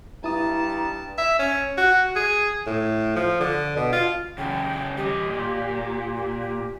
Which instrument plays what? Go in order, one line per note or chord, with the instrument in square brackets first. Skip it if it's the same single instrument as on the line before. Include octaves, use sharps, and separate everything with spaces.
[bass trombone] G2 [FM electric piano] E4 D#6 [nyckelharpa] A5 [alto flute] A#5
[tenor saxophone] E5
C#4
F#4
G#4
A2
F3
D3
B2
F4
[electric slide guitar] C#3 F#3 A4 [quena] G5
[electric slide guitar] G3 D#5 [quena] G4
[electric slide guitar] A#2
[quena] G4
G4